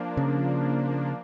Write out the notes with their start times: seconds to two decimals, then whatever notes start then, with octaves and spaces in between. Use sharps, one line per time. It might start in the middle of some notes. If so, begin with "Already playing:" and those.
Already playing: F3 A#3 D4
0.17 C#3